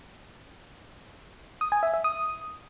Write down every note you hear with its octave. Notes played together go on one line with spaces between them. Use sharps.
D#6
G#5
E5
E5
D#6